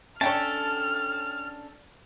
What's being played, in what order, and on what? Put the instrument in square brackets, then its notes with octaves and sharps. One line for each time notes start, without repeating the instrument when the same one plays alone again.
[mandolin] C#4 D4 A4 [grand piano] C#5 G5 [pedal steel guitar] A5 [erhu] F6